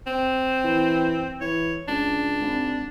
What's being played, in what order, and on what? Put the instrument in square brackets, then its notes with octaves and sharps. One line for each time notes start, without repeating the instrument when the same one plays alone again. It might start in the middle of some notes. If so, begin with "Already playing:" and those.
[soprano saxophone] C4
[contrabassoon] E3
[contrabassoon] E3 [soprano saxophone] C#5
[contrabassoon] C#2 [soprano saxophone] D4
[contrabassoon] G#1